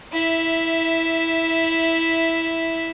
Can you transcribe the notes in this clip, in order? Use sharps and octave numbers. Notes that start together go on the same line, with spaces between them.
E4 E5